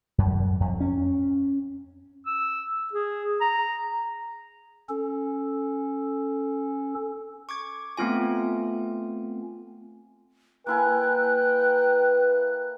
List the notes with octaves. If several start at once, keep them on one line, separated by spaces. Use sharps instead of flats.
F#2
F2
C#4
E6
G#4
A#5
C#4 A4
C#6 D6 G#6
A3 B3 C4 F4 G#5
A#3 E4 B4 G5 G#5 F#6